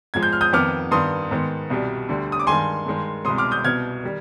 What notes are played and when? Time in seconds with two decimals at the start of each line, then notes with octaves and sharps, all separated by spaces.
0.14 G#2 F3 G#3 G#6
0.23 G6
0.33 F6
0.41 D#6 G6
0.53 F2 D#3 B3 D6 F6
0.91 G2 D#3 B3 C6 D#6
1.31 G#2 D#3 B3
1.70 C2 B2 G3
2.09 D2 D3 G3
2.32 D#6
2.40 D6
2.47 G2 D#3 G#3 G#5 C6
2.86 G2 D#3 G#3
3.25 C2 B2 G#3 C6 D#6
3.38 D6 F6
3.51 D#6 G6
3.64 C2 B2 B3 F6 G#6
4.03 D#3 G3